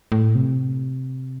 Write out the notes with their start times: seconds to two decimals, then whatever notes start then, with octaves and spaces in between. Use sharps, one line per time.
0.12 A2
0.35 C3